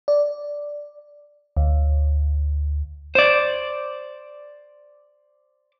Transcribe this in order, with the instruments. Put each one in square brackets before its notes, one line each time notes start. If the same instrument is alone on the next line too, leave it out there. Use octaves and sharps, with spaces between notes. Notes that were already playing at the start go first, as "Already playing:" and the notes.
[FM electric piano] D5
D2
[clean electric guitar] C5 D5